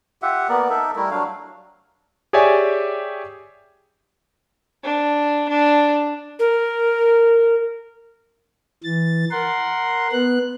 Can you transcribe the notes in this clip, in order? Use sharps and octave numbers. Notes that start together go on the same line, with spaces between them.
F4 G4 E5 F#5
A#3 B3 A#4 D5
D#4 A4 A#4 E5
G3 A3 E4 A#4
F#3 D4 F5
G4 G#4 C#5 D5 E5 G#5
D4
D4
A#4
E3 A6
A#4 F#5 C6
B3 F#6